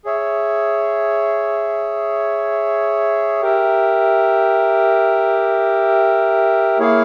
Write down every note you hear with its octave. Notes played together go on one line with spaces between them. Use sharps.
G#4 C#5 E5
G4 A#4 E5
A#3 E4 G#4 C#5 F5